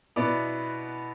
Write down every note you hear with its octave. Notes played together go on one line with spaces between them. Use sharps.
B2 B3 E4 D5